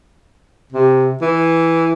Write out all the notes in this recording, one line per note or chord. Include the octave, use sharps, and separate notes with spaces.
C3
E3